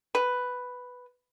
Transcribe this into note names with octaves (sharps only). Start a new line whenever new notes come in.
B4